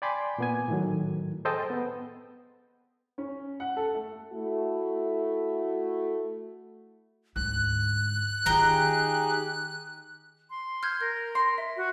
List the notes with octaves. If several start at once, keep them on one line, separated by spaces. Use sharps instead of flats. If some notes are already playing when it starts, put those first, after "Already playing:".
D5 G5 G#5 B5 C6 D6
A#2 B3 G#5
A2 D#3 F#3
G#4 A4 C5 D#5 G5 A5
B3
C#4
F#5
A4
A3
A3 E4 F#4
D2 G#2 F#6
D#3 D#4 F4 G4 G#4 G5 A#5
C6
F6 G6 G#6
A#4 G6
C6
E5
F#4